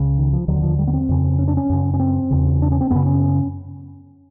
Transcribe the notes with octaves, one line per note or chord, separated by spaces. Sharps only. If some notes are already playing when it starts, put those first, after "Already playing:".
Already playing: C#2 C#3
D#3
F3
D#2 D3 F#3
F3
G3
B3
C4
F2 C#3
C#4
D4
C#4
F#2 C#3
C#4
C4
E2 C#3
D4
C#4
C4
F#2 C#3 B3
C#4